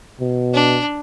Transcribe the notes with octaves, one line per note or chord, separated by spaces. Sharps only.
B2
D4